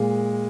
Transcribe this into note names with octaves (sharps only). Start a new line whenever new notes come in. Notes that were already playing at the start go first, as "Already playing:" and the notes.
Already playing: A#2 G#3